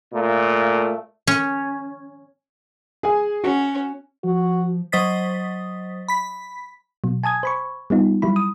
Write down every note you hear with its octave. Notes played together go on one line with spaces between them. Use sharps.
A#2 A3
C#4
G#4 G#5
C#4 F#4
F3 F#4
F#3 C5 D#5 D#6 A6 B6
B5 B6
B2 F#3
G#5 A5 D#6 G#6
C5 B5 C#6
G3 B3 D#4 F4
F#3 G3 E4 B5
D#6